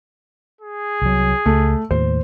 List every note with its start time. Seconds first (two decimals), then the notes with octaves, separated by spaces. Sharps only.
0.61 G#4
1.02 C2 F#3
1.46 C#2 A3
1.91 D#2 A2 C5